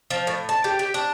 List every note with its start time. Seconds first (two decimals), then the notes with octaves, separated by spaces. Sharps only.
0.10 F3
0.27 A2
0.49 A5
0.64 G4
0.79 G4
0.94 D4